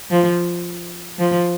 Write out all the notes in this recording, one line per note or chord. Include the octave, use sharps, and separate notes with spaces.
F3
F3